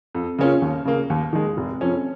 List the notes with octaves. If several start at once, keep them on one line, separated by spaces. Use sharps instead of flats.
F2
C#3 A#3 C#4 F4
D#2
C#3 A#3
D#2
D#3 G#3
F1
F2 F3 C#4